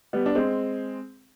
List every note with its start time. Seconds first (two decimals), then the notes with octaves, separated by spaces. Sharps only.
0.13 G3 B3
0.26 D4
0.35 G#3 C4